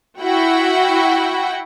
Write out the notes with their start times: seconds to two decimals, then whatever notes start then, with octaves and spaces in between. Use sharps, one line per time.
0.20 E4 F#4 F#5 G5